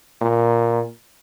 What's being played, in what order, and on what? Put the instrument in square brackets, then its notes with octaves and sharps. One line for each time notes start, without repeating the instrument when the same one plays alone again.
[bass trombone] A#2